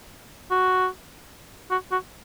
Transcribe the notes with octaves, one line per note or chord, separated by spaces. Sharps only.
F#4
F#4
F#4